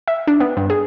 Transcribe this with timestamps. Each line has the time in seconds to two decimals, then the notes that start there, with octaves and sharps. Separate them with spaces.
0.08 E5
0.27 D4
0.40 B3
0.57 G2
0.70 G#4